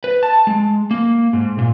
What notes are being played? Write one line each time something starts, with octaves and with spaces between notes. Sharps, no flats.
B4
A5
G#3
A#3
G#2
A#2